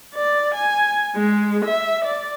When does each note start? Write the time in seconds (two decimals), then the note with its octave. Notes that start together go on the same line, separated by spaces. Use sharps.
0.14 D5
0.55 G#5
1.15 G#3
1.65 E5
2.05 D5